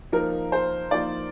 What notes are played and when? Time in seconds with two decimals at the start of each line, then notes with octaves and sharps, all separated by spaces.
0.12 F3 A#3 D#4 A#4
0.52 C5
0.91 F3 A#3 D#4 D5